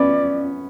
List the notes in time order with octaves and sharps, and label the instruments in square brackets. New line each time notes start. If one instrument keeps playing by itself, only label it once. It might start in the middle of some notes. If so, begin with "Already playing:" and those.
Already playing: [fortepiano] B3 C#4 [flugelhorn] D5